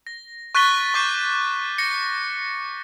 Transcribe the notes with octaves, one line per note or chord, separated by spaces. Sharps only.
A#6
C#6 F#6 A6 B6 D#7 G7
C#6 D6 G6 C7 D#7
A#6 C#7